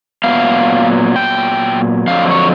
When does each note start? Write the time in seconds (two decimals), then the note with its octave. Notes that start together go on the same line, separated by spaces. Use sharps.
0.24 A#2 F#3 B3 F5
1.16 G5
2.07 F2 D3 F#3 F5
2.31 C#5